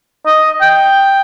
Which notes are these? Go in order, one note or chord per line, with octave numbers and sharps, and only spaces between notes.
D#5
G5